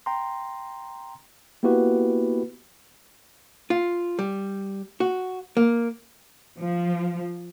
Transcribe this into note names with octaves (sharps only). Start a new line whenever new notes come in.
G5 A#5 C6
A#3 B3 E4 F#4 G4 B4
F4
G3
F#4
A#3
F3